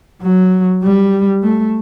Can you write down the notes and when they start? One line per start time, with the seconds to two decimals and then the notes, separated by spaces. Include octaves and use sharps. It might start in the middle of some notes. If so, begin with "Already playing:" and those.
0.22 F#3
0.83 G3
1.43 A3